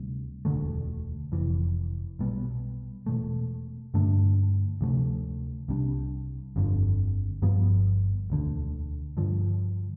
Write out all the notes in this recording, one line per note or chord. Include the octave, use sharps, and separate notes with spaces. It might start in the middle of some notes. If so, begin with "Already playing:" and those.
Already playing: D2 C3 G3
E1 D2 D3 A3
F1 F2 E3
B1 B2 G3 B3
E1 E2 B2 A3
G2 D3 A3 D4
D2 C3 F3 A3
C2 C3 G3 D4
G1 F2 D3
G1 G2 F3 B3
E1 D2 D3
G2 D3 F3